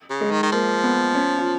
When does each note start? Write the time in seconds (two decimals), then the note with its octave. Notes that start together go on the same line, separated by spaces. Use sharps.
0.10 C#3
0.21 G#3
0.31 D#3
0.43 D#3
0.52 F3 A#3
0.84 B3
1.15 C#4
1.38 F4